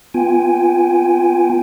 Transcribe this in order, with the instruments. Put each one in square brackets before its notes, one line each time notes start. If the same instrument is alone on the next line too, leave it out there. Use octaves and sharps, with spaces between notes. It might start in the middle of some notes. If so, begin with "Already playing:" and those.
[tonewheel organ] B3 F4 G5 G#5